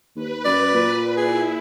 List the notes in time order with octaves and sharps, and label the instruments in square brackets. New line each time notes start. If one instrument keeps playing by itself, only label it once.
[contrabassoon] D#2 [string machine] B4
[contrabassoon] F#2 [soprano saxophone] D5
[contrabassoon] A#2
[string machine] E4 [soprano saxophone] G#4